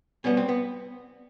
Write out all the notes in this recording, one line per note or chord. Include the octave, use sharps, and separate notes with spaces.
B2 G3 B3 C#4
C4
B3